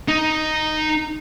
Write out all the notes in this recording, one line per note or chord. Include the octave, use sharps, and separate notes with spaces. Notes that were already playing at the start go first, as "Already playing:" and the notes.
D#4